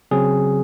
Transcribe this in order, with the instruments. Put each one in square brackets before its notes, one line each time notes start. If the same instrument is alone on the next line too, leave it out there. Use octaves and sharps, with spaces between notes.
[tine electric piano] C#3 F#3 C4 G#4